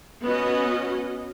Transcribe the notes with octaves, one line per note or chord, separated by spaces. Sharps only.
B3 C#4 F#4 D#5